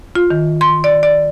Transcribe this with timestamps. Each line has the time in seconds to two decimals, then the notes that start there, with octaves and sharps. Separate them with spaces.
0.15 F4
0.30 D#3
0.61 C6
0.84 D5
1.03 D5